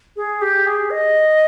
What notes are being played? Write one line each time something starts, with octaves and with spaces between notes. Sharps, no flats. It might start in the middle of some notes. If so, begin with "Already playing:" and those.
G#4
G4
G#4
D#5